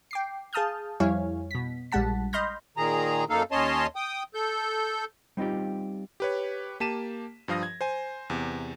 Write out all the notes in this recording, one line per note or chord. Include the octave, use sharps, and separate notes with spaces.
G5 D6 C7
G#4 F5 A5 D#6 F6 G6
F2 G3 E4 C#5 F5 G#5
B2 B6
A#1 G3 G#3 F#5 A5 B6
D#5 B5 C6 F6 G6 A#6
A#2 D#3 G#4 A#5
F#2 A#3 D#4 A4 F5
D#2 C#4 C#5 D#5 A5 C6
G5 D#6
A4 G6
G3 C4 D#4 F4 G4
G4 B4 C#5
A#3 G4 A5 B6 D#7 E7
G2 F3 F5 D#6 A#6
G#6
C5 G#5
E2 C3